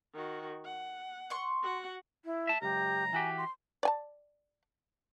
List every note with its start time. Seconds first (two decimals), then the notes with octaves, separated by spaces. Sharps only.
0.14 D#3 F#4
0.65 F#5
1.30 C6 C#6
1.63 F#4 F#5
2.25 E4
2.47 E5 A5
2.62 C#2 F#2 G4 A#5
3.13 E3 F#4 G4 G#5
3.38 C6
3.83 D5 G#5 A5